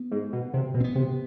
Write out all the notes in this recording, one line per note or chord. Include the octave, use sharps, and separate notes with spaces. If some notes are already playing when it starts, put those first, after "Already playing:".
Already playing: B3
G#2
B2
C3
B2
C4
B3
C3